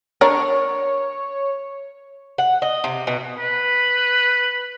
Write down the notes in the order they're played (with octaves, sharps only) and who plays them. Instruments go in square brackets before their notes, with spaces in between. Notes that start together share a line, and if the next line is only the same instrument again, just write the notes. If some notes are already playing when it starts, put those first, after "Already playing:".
[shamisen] D4 A#4 [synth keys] C#5
[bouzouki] F#5
D#5
C3
B2
[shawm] B4